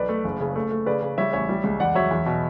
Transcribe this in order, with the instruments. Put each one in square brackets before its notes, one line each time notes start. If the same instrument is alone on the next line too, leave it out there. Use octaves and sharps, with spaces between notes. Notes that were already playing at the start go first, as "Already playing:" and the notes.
Already playing: [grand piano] B1 B4 D5
A3
F#1
C#3
A3
A3
C#3 B4 D5
C#3
G3 C#5 E5
A1 C#5 E5
G3
C#2
E2 D5 F#5
F#3 C#5 E5
E2
B2